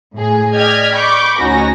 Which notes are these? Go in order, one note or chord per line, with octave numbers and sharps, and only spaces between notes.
A2 G#4
D5 D#5 G5 F6 G#6 B6
B5 C#6 D6 G6
D2 C#4 D#4 F#4 A#6